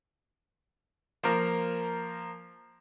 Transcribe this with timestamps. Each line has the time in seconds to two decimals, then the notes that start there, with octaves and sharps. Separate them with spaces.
1.23 F3 A#3 A#4